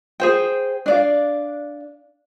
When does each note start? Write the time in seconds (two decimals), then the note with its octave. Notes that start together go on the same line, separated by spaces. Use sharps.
0.20 G#4 C5 G5
0.86 D4 D5 F5